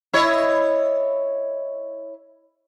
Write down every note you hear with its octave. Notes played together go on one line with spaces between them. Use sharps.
E4 C#5 D#5